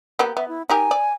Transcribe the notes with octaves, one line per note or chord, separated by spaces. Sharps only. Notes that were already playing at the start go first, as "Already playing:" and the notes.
A#3 B3 G4
B3 E5
E4
D#4 G4 A#4 G#5
D5